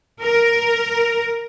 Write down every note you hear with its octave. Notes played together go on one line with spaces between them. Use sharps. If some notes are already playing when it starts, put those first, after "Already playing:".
A#4